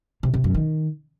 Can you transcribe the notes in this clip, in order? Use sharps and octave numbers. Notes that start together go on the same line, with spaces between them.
C3
C3
F#2
D#3